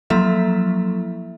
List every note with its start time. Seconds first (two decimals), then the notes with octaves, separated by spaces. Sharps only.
0.10 F3 F#3 A#3 E4 A4 E5